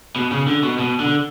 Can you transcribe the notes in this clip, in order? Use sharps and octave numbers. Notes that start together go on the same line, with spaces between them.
B2
C#3
D3
B2
B2
D3